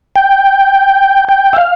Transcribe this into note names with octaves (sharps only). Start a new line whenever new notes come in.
G5
G5
E5
F5